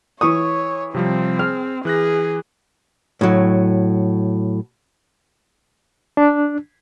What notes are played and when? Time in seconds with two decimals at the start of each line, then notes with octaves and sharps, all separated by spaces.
0.21 E3 C#5 C#6 D#6
0.94 C3 F3 G3 C4
1.39 G#4 F6
1.85 E3 G#4 F#6 A#6
3.21 A2 F#3
6.17 D4